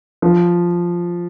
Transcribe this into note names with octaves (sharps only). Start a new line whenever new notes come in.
F3